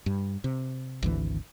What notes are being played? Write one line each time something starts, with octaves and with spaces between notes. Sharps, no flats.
G2
C3
G#1 D2 E3